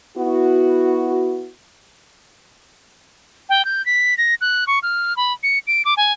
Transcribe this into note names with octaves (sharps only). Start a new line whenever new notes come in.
B3 E4 F#4
G5
G6
B6
A#6
F#6
C#6
F6
B5
C#7
D7
D6
G#5